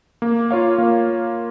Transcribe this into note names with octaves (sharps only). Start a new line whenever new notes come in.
A#3
F4 C#5 F5
A#3